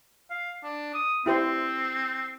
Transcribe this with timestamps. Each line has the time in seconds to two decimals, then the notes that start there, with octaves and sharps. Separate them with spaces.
0.30 F5
0.64 D4
0.94 D#6
1.26 C4 E4 G4 C5